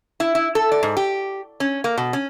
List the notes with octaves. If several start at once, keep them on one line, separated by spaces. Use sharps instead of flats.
E4
E4
A4
D5
G#2
G4
C#4
A#3
B2
C#4